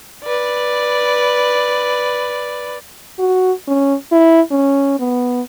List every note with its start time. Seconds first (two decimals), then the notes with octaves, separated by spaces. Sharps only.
0.25 B4 D5
3.19 F#4
3.68 C#4
4.12 E4
4.52 C#4
5.00 B3